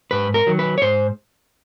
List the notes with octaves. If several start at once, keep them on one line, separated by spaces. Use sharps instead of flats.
G#2 B4
A#4
D#3 F#3
B4
C#5
G#2 C5